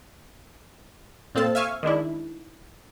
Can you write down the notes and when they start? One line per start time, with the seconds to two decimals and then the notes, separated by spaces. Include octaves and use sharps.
1.35 A#2 C4 F4 A4 A5
1.55 E5 F5 G#5 C#6
1.83 D#3 G#3 D4 E4